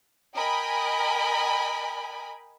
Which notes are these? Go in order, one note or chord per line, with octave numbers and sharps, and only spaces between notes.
A#4 D#5 G5 G#5 B5